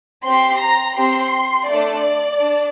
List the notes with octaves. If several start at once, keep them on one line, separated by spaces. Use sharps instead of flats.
C4 G4 C6
A#5
C4 G4 C6
A3 D4 A4 D5
D4